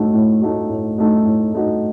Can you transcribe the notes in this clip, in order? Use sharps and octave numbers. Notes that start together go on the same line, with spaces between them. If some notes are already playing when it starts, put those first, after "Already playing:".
Already playing: A2 A3 D#4 F#4
A2
A3 D#4 F#4
A2
A3 D#4 F#4
A2
A3 D#4 F#4